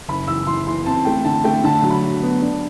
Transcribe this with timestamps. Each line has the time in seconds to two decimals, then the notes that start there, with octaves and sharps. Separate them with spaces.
0.08 F#1 B5
0.28 E3 E6
0.47 E3 C6
0.67 E3 C6
0.86 C4 A5
1.05 A3 G5
1.25 D3 A5
1.44 A3 G5
1.64 D3 A5
1.83 F#3
1.90 B5
2.02 F#3
2.22 B3
2.42 D4